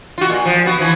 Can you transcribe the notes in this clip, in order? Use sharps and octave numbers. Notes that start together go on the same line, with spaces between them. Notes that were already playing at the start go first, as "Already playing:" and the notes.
F4 F#4
A#2
F3
B3 F#4
E3 F3